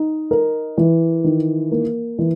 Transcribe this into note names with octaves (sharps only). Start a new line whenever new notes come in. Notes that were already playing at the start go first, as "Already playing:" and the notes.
Already playing: D#4
A#4
E3
D#3
A#3
E3